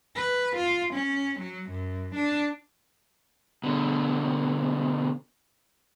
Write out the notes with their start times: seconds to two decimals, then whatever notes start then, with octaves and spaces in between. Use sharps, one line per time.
0.15 B4
0.56 F4
0.94 C#4
1.40 F#3
1.70 F#2
2.15 D4
3.64 B2 D3